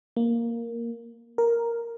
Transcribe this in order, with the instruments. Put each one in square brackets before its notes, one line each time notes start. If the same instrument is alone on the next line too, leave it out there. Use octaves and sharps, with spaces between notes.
[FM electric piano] A#3
A#4